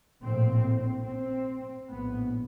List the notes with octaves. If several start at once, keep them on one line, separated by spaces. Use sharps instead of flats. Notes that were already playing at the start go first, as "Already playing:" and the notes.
A#1 A2 C4
C4
A#1 A2 B3